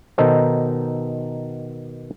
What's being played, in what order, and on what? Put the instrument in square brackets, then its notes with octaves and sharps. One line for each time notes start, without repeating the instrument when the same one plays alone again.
[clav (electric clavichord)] B2 D#3 D#4 A4 C5